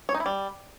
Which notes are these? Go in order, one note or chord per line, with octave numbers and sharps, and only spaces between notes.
C#5
D#4
E4
G3